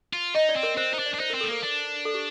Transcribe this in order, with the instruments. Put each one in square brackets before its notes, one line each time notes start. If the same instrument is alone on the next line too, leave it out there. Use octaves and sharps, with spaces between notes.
[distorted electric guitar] F4
[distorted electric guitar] D#4 [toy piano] D#5
[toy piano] D5
[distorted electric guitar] C4
[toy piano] A#4
[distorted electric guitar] C4 [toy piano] C5
[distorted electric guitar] D#4 [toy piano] C5
[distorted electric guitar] D4
[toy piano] D5
[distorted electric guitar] D4
[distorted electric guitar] D#4 [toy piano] C5
[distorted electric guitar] C4 [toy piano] A#4
[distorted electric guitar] A3 [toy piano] A4
[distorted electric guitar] A#3 [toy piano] A#4
[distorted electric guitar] D4
[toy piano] A4
G4